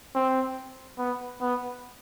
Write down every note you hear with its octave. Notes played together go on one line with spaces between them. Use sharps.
C4
B3
B3